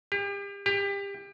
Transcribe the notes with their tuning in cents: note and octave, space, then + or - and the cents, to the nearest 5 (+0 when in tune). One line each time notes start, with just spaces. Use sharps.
G4 +35
G4 +25